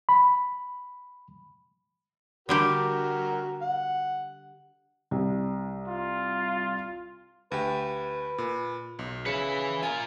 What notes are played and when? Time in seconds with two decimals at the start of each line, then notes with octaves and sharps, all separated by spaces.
0.09 B5
2.49 D3 G3 F#4 G4 A#4
3.61 F#5
5.11 C2
5.88 F4
7.52 D2 G4 B4
8.38 A#2
8.99 B1
9.26 C#3 B4 E5 C#7
9.83 F4 A#4 G#5